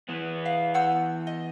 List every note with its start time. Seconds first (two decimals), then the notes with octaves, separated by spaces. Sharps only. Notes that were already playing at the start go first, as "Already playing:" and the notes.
0.09 E3 B3
0.46 F5
0.74 F#5 E6 G6
1.27 D#5